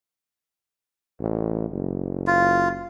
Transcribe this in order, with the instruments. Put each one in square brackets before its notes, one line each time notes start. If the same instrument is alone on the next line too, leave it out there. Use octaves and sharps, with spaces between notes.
[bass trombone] A1
F#1
[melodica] F4